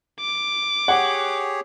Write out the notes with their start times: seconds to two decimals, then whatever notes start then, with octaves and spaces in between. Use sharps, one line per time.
0.20 D6
0.88 G4 G#4 C#5 F#5